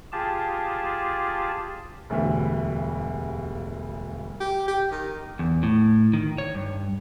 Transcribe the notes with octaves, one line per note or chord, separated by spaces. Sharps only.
F4 G4 G#4 A5
E1 D2 G2 G4 E5
G4
G4
D#3
E2
A2
D#3
C#5
G2